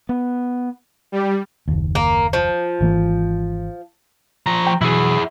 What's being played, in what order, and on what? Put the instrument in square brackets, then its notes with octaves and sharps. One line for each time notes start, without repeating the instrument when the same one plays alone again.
[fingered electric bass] B3
[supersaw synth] G3
[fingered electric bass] F#1 D#2
[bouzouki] A#3
F3
[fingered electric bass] G#1 E3 A#3
[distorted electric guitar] F3 A#5
[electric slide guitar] G5
[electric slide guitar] B2 E3 F#3 [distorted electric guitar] E4 G#4